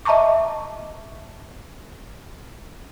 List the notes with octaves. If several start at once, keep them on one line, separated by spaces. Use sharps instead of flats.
D#5 E5 A5 A#5 C#6 D6